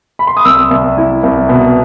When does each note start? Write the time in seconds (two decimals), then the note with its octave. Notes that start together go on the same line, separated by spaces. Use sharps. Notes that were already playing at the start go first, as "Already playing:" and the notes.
0.19 B5
0.27 C6
0.37 D#6
0.45 C2 E6
0.71 C2
0.98 E4
1.23 C2
1.49 B2